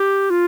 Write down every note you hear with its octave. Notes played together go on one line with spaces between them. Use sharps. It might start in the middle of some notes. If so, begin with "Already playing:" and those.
Already playing: G4
F4